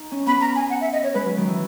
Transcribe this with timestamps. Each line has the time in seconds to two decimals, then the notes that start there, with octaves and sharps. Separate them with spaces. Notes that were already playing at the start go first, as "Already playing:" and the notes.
Already playing: D#4
0.12 C#4
0.26 B3 B5
0.41 A#5
0.55 G#5
0.70 F#5
0.81 E5
0.93 D#5
1.03 C#5
1.14 G#3 B4
1.26 F#3
1.37 D#3
1.48 E3